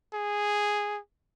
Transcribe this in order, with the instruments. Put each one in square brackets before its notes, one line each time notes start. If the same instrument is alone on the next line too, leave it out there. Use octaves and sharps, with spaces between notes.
[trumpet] G#4